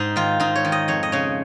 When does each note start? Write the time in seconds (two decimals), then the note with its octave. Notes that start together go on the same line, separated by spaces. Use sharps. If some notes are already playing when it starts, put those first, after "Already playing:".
Already playing: G#2 D#4
0.16 D#3 F4
0.40 G#2 D#4
0.56 C#5
0.65 D#3
0.72 D#5
0.88 F2 C#5
1.03 D#5
1.12 C#3 C#5